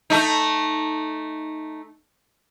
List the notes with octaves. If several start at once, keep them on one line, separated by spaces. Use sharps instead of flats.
A3 D#4